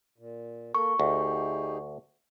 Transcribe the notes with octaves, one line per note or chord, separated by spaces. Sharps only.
A#2
A#3 A4 A#4 C#6
D2 D#4 G4 G#4